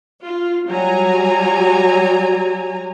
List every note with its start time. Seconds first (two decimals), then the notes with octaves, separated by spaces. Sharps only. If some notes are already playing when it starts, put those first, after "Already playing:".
0.24 F4
0.69 F#3 G3 G#5 A#5